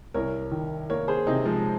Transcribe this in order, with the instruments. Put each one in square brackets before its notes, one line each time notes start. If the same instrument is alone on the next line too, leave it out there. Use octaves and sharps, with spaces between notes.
[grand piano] C2 [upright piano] A#4 C#5
[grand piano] D#3
[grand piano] A#3 [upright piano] A#4 C#5
[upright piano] G#4 C5
[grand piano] C3 [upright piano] C4 D#4
[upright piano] F3 G#3